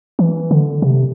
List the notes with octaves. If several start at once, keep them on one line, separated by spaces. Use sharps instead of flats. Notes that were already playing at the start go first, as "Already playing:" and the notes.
E3
D3
C3